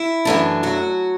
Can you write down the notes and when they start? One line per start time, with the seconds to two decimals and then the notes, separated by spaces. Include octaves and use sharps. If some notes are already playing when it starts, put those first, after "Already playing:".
Already playing: E4
0.25 F#2 E3 A3 D4
0.63 F#3 F#4